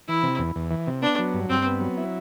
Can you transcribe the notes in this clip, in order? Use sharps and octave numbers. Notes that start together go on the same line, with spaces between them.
E3 E4
C3
E2
E2
E3
C3
B3 D4
F#3
G2
G2 C4
B3
F#3
E4